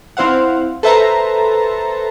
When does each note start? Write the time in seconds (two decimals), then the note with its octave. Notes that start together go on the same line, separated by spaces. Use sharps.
0.17 C4 E4 C5 F5 F#5
0.83 A4 B4 C5 E5 A5 A#5